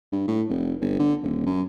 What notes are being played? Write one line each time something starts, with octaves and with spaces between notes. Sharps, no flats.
G2
A2
F1
G1
D3
D#1
F#2